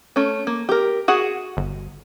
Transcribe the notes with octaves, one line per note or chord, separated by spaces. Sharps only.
A3 C#4
A#3
G4 A#4
F#4 G#4 F#5
G1